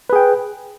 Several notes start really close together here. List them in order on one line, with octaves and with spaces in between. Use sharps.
B4 G#4 G5